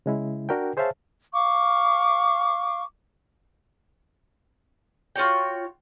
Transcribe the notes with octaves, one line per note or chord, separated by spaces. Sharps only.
C#3 G#3 E4
D4 F#4 A#4 D5 G5
G#4 C5 C#5 E5 F5 A5
F5 C#6 D6
F4 F#4 C#5 G5